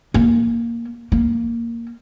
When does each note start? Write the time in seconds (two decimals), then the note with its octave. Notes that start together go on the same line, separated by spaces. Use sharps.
0.14 A#3
1.12 A#3